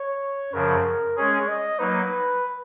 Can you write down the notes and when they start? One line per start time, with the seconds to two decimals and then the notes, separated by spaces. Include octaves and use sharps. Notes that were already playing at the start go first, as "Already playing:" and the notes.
Already playing: C#5
0.53 F#2 C#3 F3 A#4
1.17 G#3 C#4 G#4 C#5
1.48 D#5
1.78 F#3 A#3 D#4 B4